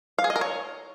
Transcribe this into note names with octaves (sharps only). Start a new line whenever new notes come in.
F5
G#4
D#5
A#4
C#5